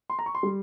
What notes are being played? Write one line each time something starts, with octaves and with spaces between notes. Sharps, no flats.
C6
A#5
C#6
C6
G3